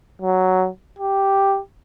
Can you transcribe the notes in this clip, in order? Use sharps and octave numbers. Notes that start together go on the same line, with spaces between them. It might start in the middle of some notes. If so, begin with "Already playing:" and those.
F#3
G4